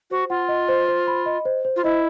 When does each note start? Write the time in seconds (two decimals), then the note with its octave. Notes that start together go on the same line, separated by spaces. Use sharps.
0.11 F#4 C5
0.30 F4 F#5
0.49 D#5
0.68 C5
0.88 C5
1.07 B5
1.26 D#5
1.45 C5
1.65 C5
1.76 F4
1.84 E4 D#5